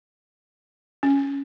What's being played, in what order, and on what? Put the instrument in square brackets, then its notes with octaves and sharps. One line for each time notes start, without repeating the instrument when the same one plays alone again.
[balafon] C#4